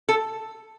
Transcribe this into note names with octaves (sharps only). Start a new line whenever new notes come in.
A4